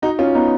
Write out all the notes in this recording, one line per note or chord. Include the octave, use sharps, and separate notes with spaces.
D#4 F#4
C#4 F4
B3 D#4